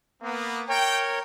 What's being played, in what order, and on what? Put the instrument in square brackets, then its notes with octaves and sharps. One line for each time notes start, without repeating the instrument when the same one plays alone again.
[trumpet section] A#3 B3
[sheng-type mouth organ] A#4 C#5 [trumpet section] G5